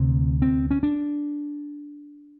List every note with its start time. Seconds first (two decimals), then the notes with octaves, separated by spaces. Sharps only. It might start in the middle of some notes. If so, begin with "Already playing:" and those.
Already playing: D2 C3 C4
0.42 C4
0.71 C#4
0.83 D4